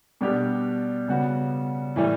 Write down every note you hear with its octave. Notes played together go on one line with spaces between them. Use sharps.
B2 G3 D4 G4
C#3 G3 B3 F#4
A2 E3 G3